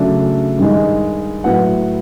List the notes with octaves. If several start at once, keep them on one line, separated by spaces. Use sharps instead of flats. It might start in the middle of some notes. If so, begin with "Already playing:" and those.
Already playing: C#3 F#3 A3 D4
G2 D#3 G#3
A2 F#3 B3 F#5